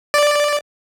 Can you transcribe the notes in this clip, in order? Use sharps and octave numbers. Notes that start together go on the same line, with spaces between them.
D5